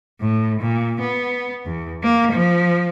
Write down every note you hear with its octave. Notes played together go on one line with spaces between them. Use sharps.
A2
A#2
B3
E2
A#3
F3